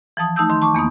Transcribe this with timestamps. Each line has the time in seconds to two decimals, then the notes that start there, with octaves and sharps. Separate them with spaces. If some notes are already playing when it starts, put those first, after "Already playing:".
0.17 E3 F3 A5 D#6
0.36 A3 D#4 A5 D#6 E6 G6
0.50 D#3 C6
0.62 A5 C#6 D6
0.75 E2 A#3 B3 D#6